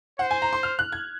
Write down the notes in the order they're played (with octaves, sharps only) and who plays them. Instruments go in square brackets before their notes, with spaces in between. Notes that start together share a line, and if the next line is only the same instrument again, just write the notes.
[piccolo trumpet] C5 [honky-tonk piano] F#5
[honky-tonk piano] G#5
A#5
C6
F6
F#6
G#6